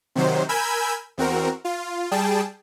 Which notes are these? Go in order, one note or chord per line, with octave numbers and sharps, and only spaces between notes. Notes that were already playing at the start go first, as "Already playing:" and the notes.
C3 D#3 F#3 C5
A#4 G#5 B5 E6 G6 G#6
E2 C4 F#4 A#4
F4
G3 G#4 G5 A5